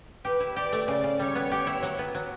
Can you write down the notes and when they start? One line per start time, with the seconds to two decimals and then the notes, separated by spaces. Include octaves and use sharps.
0.25 G4 B4
0.40 E4
0.56 G4 D5
0.72 A3
0.88 C#3 D5
1.04 C#3
1.19 G3 C#5
1.35 B3
1.52 G4
1.67 E4
1.83 F#3
1.99 B3
2.15 F#3